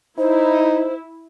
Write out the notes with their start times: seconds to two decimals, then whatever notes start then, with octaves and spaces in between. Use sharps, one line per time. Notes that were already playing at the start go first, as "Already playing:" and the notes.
0.18 D#4 E4 C5